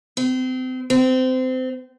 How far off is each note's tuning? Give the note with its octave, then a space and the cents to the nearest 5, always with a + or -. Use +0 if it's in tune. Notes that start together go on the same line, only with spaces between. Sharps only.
C4 -30
C4 -25